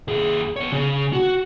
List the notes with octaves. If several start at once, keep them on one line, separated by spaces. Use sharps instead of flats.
D#2 G#4
B3 C#5
C#3
F#4